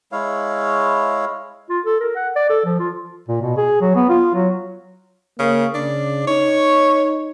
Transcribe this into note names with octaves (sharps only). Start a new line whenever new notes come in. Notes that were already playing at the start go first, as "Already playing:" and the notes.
G#3 E4 C#5 F5
F4
A4
A#4
F#5
D5
A4
F3
F4
A#2
B2
G#4
F#3
B3
F4
F#3
C#3 A#3
C#3 D4
D#4 C#5